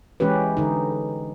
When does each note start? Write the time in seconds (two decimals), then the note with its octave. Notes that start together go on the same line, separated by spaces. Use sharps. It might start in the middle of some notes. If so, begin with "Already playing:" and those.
0.20 E3 G#3 C#4 G4 B4
0.57 D3 D#4